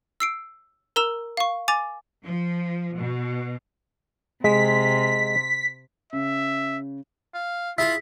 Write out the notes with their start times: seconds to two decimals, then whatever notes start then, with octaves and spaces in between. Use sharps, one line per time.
0.20 E6 C7 D7
0.96 A#4 A#5 E6 E7
1.37 F5 C#6
1.68 G#5 D6 A6 F7
2.25 F3
2.96 B2
4.44 C3 G#3 B6
6.13 C#3 E5
7.34 F5
7.78 E4 F4 G#4 E5 B5 B6